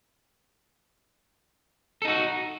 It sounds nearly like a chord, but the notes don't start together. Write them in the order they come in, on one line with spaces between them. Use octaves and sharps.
A4 D#4 F#4